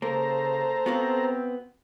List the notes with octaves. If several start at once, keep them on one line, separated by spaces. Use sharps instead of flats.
C#3 A#3 A4 C5 A#5
B3 C4 F#4 F5